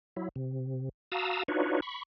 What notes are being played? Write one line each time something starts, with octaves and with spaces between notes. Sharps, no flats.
F#3 E4
C3
F#4 F5 A5 A#5 D#6 E6
D4 D#4 F4 F#4 B4 C#5
B5 C#6